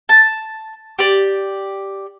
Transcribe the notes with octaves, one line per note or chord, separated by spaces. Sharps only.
A5
G4 D5